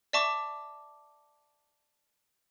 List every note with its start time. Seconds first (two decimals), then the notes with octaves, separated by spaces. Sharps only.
0.13 D5 E5 A5 C#6 D6